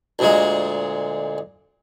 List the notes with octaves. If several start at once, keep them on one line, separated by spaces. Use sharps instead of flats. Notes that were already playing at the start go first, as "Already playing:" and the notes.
D2 A#2 G#3